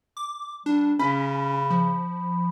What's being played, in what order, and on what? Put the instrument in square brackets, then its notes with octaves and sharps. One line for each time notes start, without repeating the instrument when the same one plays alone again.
[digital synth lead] D6
[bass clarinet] G3 [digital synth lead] D4
[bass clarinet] C#3 [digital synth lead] C#4 [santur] B5
[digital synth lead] F3